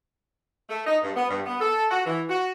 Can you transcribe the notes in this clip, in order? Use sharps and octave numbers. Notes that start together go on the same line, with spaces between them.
A3
D#4
G2
B3
G2
B3
A4
F#4
E3
F#4